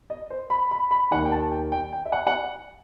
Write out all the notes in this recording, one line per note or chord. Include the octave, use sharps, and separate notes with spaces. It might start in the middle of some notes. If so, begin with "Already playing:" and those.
D#5
C5
B5
B5
B5
D#2 D#3 F#5
G5
A5
G5
G5
G5
E5
F#5
F#5